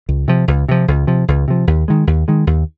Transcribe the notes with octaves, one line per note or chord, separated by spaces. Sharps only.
C#2
C3 F3
C#2
C3 F3
C#2
C3 F3
C#2
C3 F3
D#2
D#3 G#3
D#2
D#3 G#3
D#2